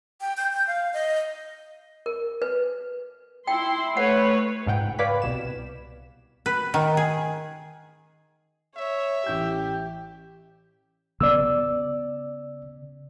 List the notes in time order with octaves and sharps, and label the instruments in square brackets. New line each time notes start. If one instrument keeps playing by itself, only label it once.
[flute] G5
G6
G6
F5
D#5
[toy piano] A#4
B4
[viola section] E4 C6 [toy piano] G5
[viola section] A3 B4 C#5 [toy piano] F#5
[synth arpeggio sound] C#2 G#2 F#5 G5
B4 C#5 D5 F5 B5 B6
C2 B2 E7
[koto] B4
D#3
G#4
[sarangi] C#5 [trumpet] E5
[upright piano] A1 G6 [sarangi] G4
[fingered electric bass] C#3 B3 [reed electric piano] D5 E6